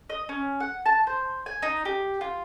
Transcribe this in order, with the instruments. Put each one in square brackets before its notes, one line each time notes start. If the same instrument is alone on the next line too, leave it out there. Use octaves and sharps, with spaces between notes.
[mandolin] D#5
C#4
F#5
A5
C5
G#5
D#4
G4
F4